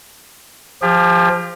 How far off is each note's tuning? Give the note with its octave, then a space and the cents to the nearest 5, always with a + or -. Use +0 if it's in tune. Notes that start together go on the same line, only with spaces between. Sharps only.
F3 +0 G4 +40